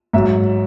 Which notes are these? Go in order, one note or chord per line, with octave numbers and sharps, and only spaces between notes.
G#2 F#3 E5